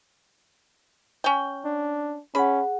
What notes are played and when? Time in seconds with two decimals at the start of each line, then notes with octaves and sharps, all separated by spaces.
1.24 C#4 G5
1.65 D4
2.35 C#4 G#4 F#5 B5